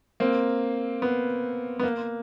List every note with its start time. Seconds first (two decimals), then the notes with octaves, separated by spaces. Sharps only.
0.20 A#3 C4
1.02 B3
1.79 B3
1.83 A#3